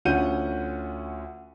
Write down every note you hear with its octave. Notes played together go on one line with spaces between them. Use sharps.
D2 C#4 F4 F#5 G6 D#7